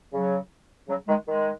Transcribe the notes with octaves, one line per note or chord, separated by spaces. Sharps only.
C#3 F#3
C#3 F#3
D#3 G#3
D#3 G#3